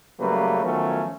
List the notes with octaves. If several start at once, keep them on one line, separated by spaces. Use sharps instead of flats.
C#3 F#3 G3 A3 A#3 B4
D#3 F3 F#3 A3 B3 C#4